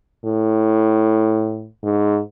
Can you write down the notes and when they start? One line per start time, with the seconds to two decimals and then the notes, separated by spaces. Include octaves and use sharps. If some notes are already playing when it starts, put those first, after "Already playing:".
0.25 A2
1.83 G#2